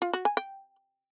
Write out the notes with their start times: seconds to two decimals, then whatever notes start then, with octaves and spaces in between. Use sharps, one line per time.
0.02 F4
0.13 F#4
0.25 G#5
0.37 G5